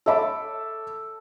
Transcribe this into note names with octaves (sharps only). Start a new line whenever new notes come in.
A4 C#5 E5 B5 D6